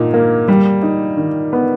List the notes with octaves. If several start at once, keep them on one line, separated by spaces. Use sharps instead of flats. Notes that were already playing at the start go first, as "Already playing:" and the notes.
Already playing: A#2 D#4
A#3
G3
D#4
D#3
B3